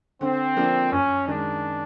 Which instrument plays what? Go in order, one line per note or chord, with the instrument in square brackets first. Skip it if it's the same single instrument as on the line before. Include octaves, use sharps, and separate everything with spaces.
[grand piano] D3 [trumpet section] C4
[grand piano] F3 A#3 D4
[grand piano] F#2 [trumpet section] C#4
[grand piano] D#3 G#3 [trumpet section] D4